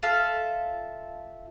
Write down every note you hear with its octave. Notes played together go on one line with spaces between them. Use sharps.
F4 A4 E5 F5